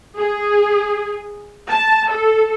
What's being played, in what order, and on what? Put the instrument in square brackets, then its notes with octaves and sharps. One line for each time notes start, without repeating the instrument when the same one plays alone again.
[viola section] G#4
A5
A4